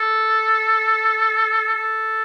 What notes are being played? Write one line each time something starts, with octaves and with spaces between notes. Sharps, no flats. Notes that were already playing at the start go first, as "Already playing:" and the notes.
Already playing: A4
A4